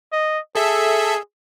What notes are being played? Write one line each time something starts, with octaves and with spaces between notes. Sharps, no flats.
D#5
G#4 A4 E5